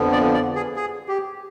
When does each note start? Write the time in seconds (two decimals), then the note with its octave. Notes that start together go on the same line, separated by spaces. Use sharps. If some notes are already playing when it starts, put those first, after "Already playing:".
Already playing: F2 D3 F3 B3
0.12 D5
0.33 D5
0.55 G#4
0.76 G#4
1.08 G4